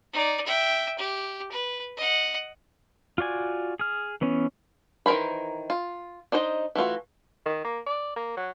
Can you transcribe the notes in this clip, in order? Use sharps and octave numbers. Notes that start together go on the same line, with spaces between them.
D#4 D5
E5 G5
G4
B4
D#5 F#5
F4 F#4 D5 G#5
G#4 F6
E3 B3 C#4
D#3 E3 A#4 C5 B5
F4
D4 D#4 C5 D#5
E3 A3 F4 F#4
D#3
A#3
D5
A#3
F#3